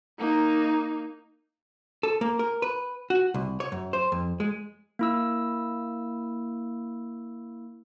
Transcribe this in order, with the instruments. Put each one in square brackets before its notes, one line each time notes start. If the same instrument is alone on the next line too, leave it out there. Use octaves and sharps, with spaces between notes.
[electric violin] A#3 D#4
[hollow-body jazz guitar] A4
A#3
A#4
B4
F#4
C2
C#5
F#2
C5
F2
G#3
[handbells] A#3 E4 E6